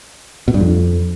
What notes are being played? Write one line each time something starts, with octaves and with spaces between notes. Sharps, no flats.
B2
G2
F2